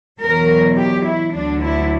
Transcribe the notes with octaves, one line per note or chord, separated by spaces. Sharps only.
E2 B2 F#3 A#4
G4
E4
D2 D3 F#3 D4
E4